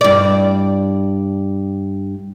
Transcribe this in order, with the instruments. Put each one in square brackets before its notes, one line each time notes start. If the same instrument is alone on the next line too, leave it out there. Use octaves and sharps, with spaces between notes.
[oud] G2 D5